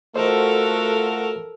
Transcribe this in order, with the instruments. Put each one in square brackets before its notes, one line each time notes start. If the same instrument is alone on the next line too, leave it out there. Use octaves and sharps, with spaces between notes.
[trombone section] A3 F4 F#4 [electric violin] A4 A#4 [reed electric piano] C5 D#5